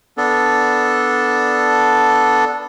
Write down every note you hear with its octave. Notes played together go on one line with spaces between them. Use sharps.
B3 D4 A4